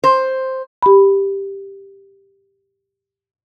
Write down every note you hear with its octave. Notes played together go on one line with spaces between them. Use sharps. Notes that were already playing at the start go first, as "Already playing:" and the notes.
C5
G4 B5